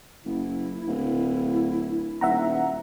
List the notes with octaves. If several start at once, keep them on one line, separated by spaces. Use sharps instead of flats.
F#1 E4
D1
D#1 E5 F#5 A#5